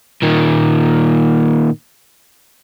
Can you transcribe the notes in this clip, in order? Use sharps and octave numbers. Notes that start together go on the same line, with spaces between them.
A#2 D#3